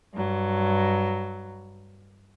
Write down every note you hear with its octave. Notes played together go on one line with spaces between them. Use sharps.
G2 F#3